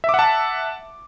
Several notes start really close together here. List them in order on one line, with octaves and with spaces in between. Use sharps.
E5 D6 F#5 A5